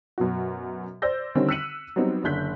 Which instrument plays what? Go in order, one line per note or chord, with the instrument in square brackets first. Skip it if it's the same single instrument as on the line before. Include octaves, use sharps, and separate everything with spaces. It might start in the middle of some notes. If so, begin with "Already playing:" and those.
[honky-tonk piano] F#2 B2 F#4
C5 D5 E6 G6 A#6
D3 D#3 G3 C4 C#4
E6 F#6 B6 C#7 D#7 F#7
F#3 G3 B3 C4 D#4
F#1 D3 F#6 G6 B6